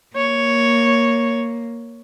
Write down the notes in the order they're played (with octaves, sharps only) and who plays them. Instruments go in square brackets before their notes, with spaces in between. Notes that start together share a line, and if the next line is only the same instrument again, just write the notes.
[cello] A#3 [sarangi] C#5